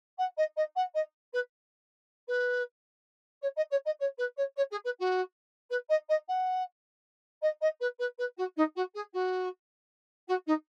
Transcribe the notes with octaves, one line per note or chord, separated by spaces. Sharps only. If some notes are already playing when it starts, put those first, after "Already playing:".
F#5
D#5
D#5
F#5
D#5
B4
B4
C#5
D#5
C#5
D#5
C#5
B4
C#5
C#5
G#4
B4
F#4
B4
D#5
D#5
F#5
D#5
D#5
B4
B4
B4
F#4
D#4
F#4
G#4
F#4
F#4
D#4